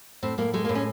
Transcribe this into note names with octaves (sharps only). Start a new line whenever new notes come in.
A2 C4
A2 A#3
G#3 A3
A#3
A2
C#4